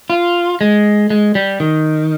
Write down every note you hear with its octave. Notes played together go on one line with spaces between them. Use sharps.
F4
G#3
G#3
G3
D#3